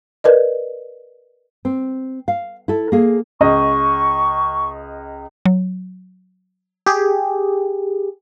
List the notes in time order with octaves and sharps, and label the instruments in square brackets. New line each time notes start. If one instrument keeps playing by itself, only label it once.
[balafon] A#4 B4 D5 D#5
[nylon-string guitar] C4
F5
E4 A4
A#3 G#4
[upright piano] C#2 D#5 [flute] C#6
[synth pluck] F#3
[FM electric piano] G4 G#4